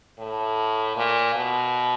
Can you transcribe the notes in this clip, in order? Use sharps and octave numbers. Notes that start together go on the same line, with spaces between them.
A2
A#2
B2